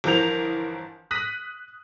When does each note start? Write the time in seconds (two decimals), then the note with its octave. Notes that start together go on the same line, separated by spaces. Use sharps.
0.04 G1 E3 F3 A#4 G6 F7
1.11 D#6 F#6 A#6 B6 D#7